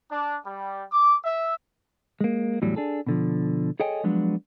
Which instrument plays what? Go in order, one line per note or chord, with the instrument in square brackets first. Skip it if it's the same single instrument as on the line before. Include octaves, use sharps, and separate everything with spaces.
[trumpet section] D4
G3
D6
E5
[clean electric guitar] G#3 A#3
E2 A2 F#3 G3
D4 G#4 A4
B2 D3 F3
G#4 A4 C#5 D#5 G5 G#5
F3 F#3 G#3 B3 D4